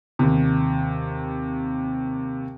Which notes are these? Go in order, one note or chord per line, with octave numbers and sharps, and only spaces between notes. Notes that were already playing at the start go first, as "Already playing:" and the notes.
D#2 C3